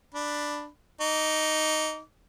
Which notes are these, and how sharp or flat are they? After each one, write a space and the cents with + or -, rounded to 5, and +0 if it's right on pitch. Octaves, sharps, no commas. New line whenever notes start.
D4 +5 B5 +0
D#4 +0 D6 -30